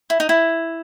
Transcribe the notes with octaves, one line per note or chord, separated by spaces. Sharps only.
E4
D#4
E4